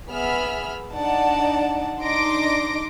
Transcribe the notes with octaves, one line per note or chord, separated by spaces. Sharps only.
B3 G#4 E5 B5 F6
D4 D#4 D5 F#5 A5
D4 D#4 C6 D6 A#6 D7